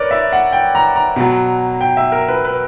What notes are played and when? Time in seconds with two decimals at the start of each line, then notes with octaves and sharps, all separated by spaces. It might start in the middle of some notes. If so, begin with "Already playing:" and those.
Already playing: A#4 B4 C#5 D5
0.11 E5
0.32 F#5
0.52 G5
0.75 A#5
0.96 A#5
1.16 B2 F#3
1.81 G5
1.97 E5
2.12 A#4
2.28 B4
2.45 B4